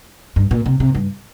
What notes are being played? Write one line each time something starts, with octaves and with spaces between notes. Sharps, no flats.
G2
A#2
C3
C3
G2